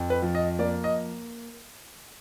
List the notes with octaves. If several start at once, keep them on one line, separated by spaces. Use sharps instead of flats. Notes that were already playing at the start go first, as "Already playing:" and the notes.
Already playing: F2
B4
F3
D#5
A#3 D5
D#5